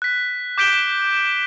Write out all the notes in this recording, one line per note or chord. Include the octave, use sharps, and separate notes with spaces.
F#6 B6
D6 G6 B6 D7 E7 G7